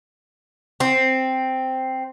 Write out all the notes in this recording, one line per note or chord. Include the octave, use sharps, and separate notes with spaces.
C4